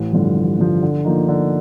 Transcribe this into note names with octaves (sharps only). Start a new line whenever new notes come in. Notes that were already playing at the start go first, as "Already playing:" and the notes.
Already playing: A1
G2 D3 F3
A1
G2 D3 F3
D3
F3 A#3 D#4
D3